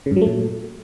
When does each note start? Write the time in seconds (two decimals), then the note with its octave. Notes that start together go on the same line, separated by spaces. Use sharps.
0.06 C#3
0.11 G2
0.16 F#3
0.21 A3
0.26 A#2